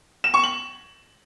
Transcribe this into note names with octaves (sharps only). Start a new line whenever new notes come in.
E7
C#6
F#7